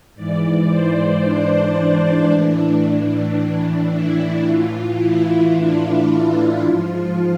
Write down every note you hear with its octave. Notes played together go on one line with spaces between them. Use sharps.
G#2 E3 D5
C5
D4
D4
A2 E3
D4
D4
E4
A2 E3 F4
E4
D4
E4
G#2 F3 F4